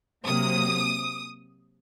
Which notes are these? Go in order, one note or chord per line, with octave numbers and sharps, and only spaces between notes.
C3 F#3 A#3 D#6